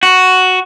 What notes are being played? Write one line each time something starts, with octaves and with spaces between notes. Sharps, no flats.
F#4